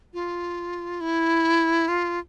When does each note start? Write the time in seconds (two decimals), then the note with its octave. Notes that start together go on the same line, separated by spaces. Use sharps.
0.14 F4
1.01 E4
1.88 F4